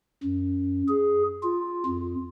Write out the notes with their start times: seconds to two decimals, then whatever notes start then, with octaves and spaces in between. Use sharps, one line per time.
0.23 F#2
0.88 G#4
1.42 F4
1.86 F2